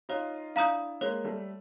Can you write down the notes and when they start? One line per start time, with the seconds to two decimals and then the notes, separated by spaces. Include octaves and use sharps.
0.09 D#4 F4 C#5
0.55 D4 E4 F5 A#5 D#6 G6
1.01 G#3 A#3 C#5
1.24 G3 A3